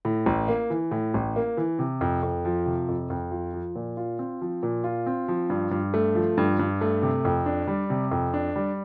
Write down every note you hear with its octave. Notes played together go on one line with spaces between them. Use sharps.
A2
A1
A#3
E3
A2
A1
A#3
E3
C3
F2
F2
F3
C3
F2
F2
F3
F3
A#2
F4
C4
F3
A#2
F4
C4
F3
G2
G2
A3
F3
G2
G2
A3
C3
F2
D4
G3
C3
F2
D4
G3